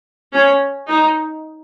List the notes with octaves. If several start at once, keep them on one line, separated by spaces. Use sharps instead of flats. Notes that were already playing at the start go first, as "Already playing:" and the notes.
C#4
D#4